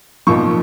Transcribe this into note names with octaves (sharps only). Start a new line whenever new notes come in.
B1 A#2 F3 C#6